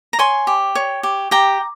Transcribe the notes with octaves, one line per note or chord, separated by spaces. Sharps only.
A#5
C#5 G#5 C6
G4
C#5
G4
G4 G5 A#5